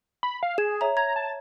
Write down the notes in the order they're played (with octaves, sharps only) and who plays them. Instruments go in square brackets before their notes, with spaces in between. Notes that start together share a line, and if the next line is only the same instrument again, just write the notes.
[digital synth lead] B5
F5
[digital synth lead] G#4 [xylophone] G#6 E7
[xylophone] C#5 E5 A#5
[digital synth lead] A#5 [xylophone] G#6
[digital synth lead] A5